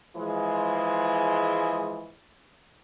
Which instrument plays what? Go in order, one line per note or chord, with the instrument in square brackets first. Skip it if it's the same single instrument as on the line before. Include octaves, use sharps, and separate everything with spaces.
[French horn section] E3 F3 G#3